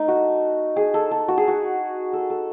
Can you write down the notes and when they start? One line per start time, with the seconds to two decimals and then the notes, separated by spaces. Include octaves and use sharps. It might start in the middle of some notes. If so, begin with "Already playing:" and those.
Already playing: A3 D#4
0.08 F#4
0.76 G#4
0.94 A4
1.11 A4
1.28 F#4
1.38 G#4
1.48 F#4
2.13 A4
2.30 A4